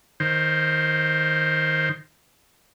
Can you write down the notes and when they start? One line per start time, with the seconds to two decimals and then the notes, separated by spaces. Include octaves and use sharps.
0.20 D#3 C5